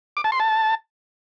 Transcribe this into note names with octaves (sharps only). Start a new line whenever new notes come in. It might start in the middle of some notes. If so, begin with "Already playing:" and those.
D6
A5
C6
A5